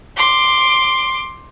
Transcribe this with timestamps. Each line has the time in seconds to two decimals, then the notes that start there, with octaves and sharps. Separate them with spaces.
0.16 C6 D6